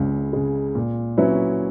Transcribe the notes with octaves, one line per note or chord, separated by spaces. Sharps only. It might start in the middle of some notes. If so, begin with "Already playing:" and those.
Already playing: C#2 C#3 G#3
C#3 G#3
A#2
F#3 C#4 E4 B4